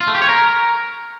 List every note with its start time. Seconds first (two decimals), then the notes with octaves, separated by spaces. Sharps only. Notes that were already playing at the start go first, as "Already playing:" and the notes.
0.01 F4
0.08 A3
0.15 G4
0.22 C#5
0.29 A#4